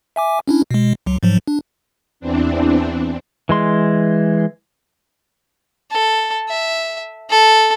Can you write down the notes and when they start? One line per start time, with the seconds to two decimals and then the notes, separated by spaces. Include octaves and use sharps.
0.16 E5 G#5 D6
0.48 C#4 D4 E4
0.71 B2 G#3
1.06 C#2 F#3
1.23 G#2 F3 F#3
1.47 D4
2.20 E2 E3 C4 D4
3.49 E3 G#3 C6
5.91 A4
6.49 E5
7.31 A4